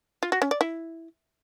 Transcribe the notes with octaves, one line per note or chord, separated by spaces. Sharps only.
F4
F#4
C#4
D5
E4